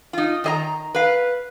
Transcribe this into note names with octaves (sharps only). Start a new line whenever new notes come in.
D#4 F4
D#3 D#5 A#5
B4 F5